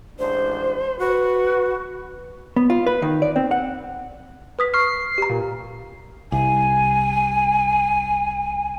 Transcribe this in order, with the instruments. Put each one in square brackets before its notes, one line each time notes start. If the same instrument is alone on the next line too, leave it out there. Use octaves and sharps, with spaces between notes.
[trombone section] A1 G#3 D4 [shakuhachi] C5
[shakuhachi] F#4 [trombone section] B4
[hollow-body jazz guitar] B3
F4
B4
D#3
D5
C4
F#5
[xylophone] B4 D#6 B6
[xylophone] C#6 F6 [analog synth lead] C7
[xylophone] G4 A#5
[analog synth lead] A#2
[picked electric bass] C2 [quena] G#5